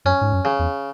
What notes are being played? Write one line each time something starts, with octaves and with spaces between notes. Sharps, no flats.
F#2 C#4
G#2
F#2
C#3
E2